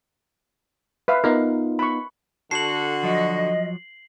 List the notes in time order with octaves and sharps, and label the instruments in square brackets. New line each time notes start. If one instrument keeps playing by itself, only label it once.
[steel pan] B4 E5 F5
[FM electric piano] B3 D#4 F4 [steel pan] A#4 F5
[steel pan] B5 C#6
[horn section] D3 F#4 [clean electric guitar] A4 [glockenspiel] C7 F#7
[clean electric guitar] F3 F#3 [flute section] D#5